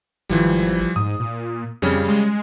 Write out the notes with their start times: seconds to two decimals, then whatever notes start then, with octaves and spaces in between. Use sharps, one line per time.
0.29 G#1 E3 F3 G3
0.96 G#2 D#6
1.20 A#2
1.82 F2 C#3 G3 C#4
2.08 G#3